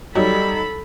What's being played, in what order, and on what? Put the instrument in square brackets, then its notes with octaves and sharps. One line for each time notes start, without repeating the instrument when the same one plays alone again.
[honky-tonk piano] F#3 D#4 [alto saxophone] G3 [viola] A4 B5